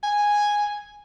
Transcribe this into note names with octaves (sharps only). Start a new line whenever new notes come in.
G#5